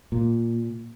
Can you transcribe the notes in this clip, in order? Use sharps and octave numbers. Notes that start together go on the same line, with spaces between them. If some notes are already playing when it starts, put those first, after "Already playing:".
A#2